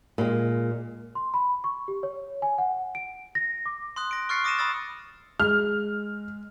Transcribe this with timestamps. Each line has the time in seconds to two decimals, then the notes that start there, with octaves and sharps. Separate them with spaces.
0.18 A#2 G#3
1.15 C6
1.34 B5
1.64 C#6
1.88 G4
2.03 C#5
2.42 G#5
2.58 F#5
2.95 D7
3.35 A#6
3.66 D6
3.96 C6 D#6 F#6
4.11 A#6 D7
4.29 C#6 F6 F#6 A6 C7 C#7
4.44 D6 D#6 A#6 C#7 D#7 E7
4.59 B5 D#6 E6 A6
5.40 G#3 F6